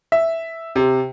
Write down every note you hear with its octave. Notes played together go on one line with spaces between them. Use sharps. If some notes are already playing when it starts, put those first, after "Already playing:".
E5
C3